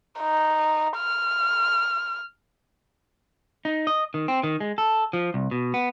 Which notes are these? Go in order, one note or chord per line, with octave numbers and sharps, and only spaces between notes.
D#4
F6
D#4
D#5
D#3
C4
D#3
G#3
A4
F3
C2
B2
B3